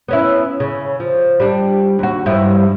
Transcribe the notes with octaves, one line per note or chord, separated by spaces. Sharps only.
B3 C#4 E4
C#3
F3
G3 D4
D#2 F#4
G2 F3 E4